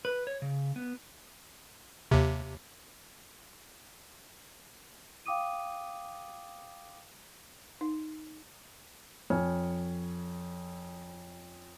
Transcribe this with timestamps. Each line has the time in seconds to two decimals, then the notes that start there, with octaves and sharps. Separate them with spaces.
0.05 B4
0.27 C#5
0.42 C#3
0.76 B3
2.11 D#2 C3
5.26 F5 G5 D6 D#6 D#7
7.81 D#4
9.30 F2 C#5 G#5 F6